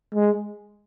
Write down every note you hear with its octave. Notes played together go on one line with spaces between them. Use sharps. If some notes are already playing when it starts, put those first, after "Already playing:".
G#3